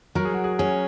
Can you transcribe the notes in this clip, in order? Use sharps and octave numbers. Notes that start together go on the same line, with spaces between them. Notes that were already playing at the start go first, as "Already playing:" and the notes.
F#3 A#4
G#4
F#4
G#4
C#4 G#4